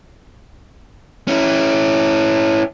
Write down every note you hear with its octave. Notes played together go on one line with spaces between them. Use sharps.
C#4 E4